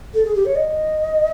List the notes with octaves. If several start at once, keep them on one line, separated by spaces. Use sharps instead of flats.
A4
G#4
G4
C#5
D#5